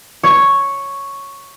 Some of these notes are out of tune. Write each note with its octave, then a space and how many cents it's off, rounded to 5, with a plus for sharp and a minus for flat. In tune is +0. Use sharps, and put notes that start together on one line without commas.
C#5 +0